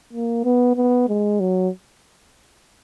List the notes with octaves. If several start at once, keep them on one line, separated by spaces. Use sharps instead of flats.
A#3
B3
B3
G#3
F#3